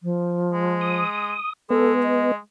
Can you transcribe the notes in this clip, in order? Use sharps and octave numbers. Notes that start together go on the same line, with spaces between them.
F3
G#3
D#6
G#3 B3 A4
D#5